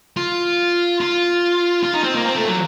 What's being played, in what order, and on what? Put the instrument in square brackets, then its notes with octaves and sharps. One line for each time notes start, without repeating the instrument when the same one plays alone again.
[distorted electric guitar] F4
F4
F4
D#4
C4
A#3
C4
A3
F#3